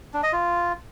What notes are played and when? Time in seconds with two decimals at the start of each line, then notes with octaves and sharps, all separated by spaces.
0.14 D4
0.23 D#5
0.33 F4